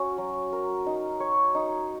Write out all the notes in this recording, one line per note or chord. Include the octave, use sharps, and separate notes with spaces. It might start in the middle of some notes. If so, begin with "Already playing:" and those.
Already playing: C#4 F#4
F#3
A#4
D#4
C#5
D#4